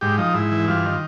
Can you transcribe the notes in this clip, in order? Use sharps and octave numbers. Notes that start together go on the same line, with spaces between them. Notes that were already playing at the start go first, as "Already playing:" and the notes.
G#2 G4
F3 D#4
G#2 E4
E3
G2 F4
D#3